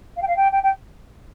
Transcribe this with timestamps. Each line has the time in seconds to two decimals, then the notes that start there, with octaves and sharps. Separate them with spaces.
0.16 F5
0.22 G5
0.27 F5
0.36 G5
0.51 G5
0.63 G5